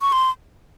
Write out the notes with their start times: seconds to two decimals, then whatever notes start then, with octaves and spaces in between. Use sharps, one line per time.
0.02 C#6
0.12 C6